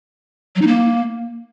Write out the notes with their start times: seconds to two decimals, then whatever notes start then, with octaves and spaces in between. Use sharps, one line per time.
0.56 F#3
0.61 D#4
0.67 A#3